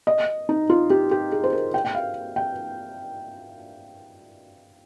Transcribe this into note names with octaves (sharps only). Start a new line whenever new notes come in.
D#5
D#4
F4
G4
G4
G#4
C5
A#4
G5
G5
F5
G5